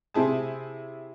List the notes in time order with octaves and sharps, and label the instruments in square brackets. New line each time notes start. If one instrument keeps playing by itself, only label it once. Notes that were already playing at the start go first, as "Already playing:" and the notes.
[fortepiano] C3 C4 E4 G#4 A5